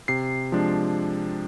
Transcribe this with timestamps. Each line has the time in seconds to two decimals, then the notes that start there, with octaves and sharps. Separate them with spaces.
0.08 C3 C7
0.52 F3 G#3 D4